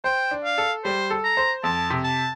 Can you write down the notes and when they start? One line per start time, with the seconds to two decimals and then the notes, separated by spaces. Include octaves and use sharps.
0.04 C5 G5
0.31 D4
0.45 F5
0.58 A4
0.84 G3 C5
1.10 A4
1.24 A#5
1.37 C5
1.64 F2 A5
1.90 C3
2.04 A5